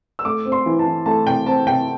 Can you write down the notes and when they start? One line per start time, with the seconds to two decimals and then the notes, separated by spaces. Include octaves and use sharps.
0.19 E6
0.25 A3 D6
0.45 C4
0.52 C6
0.66 E3
0.79 A5
0.86 E3
1.06 A3 A5
1.26 C3 G5
1.46 C4 A5
1.67 C3 G5